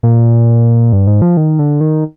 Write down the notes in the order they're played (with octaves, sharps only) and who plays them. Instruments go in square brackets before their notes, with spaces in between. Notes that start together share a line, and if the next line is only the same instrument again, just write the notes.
[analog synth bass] A#2
G2
G#2
F3
D#3
D3
D#3